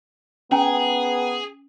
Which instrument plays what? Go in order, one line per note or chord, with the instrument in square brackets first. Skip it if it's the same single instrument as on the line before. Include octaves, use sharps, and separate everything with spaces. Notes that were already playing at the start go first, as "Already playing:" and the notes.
[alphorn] B3 [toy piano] C#4 [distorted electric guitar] G#4 [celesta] G5 G#5 A#5